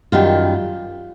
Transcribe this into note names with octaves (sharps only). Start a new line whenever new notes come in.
F#2 D#3 G3 F4